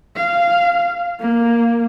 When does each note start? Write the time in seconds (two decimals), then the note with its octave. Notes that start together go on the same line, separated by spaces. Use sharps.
0.16 F5
1.21 A#3